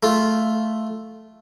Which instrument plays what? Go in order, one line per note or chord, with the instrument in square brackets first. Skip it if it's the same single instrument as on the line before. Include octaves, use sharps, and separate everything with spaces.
[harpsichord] A3 F4